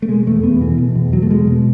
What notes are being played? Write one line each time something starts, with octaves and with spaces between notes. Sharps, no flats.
A3
B2 G#3
E2 A3
E2 B3
B2 E3
B2
E2
E2 F#3
A3
B2 G#3
B2